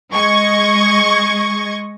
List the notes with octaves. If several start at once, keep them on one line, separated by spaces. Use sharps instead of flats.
G#3 D#5 C#6 G#6